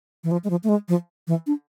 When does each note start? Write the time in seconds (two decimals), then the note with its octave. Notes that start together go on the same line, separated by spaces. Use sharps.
0.24 E3
0.31 F3
0.44 G#3
0.50 F3
0.64 A3
0.69 G#3
0.89 F3
1.27 E3
1.47 D4